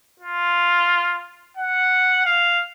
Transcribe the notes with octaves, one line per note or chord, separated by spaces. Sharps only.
F4
F#5
F5